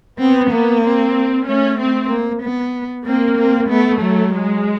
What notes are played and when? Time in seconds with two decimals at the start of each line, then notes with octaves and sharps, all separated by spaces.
0.19 B3 C4
0.51 A#3
0.83 C4
1.47 A3 C#4
1.78 C4
2.10 A#3
2.43 B3
3.06 A#3 C4
3.38 C4
3.69 A3 B3
4.01 F#3
4.33 G#3